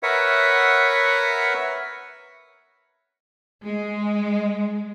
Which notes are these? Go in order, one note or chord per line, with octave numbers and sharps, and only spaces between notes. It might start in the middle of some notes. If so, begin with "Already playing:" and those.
A#4 B4 C#5 E5 F#5
G#3